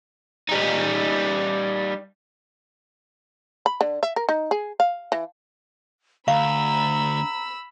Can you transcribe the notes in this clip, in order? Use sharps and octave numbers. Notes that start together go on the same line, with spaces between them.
G3 D#4
B5
D3
E5
A#4
D#4
G#4
F5
E3
D2 F5 A#5 B5 E6